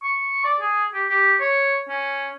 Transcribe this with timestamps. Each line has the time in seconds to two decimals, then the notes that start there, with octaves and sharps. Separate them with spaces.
0.03 C#6
0.45 D5
0.61 G#4
0.94 G4
1.09 G4
1.41 C#5
1.89 C#4